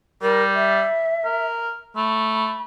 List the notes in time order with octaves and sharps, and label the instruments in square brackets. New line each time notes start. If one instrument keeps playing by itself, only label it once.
[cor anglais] G3 [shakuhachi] A#4
[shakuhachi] E5
[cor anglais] A#4
[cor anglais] A3 [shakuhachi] B5